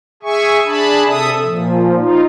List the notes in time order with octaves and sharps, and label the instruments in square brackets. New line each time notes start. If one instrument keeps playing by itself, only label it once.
[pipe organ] G#4 E5 G#5 C#6
D4 G#4 A5 B5
C3 A4 E5 D#6
A#2 F3
D#4 F4